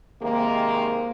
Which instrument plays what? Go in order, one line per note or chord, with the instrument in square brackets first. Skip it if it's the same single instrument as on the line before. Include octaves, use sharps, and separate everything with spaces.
[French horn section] C3 D#3 G#3 A#3